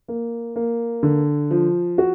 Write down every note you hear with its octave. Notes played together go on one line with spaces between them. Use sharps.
A#3
A#3
D3
F3
F#4